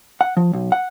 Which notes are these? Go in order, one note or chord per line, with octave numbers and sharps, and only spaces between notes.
F#5
F3
B1
F#5